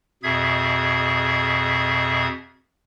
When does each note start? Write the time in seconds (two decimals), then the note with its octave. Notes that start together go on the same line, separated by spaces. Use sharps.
0.23 F2 B2 G#4 E5 G#6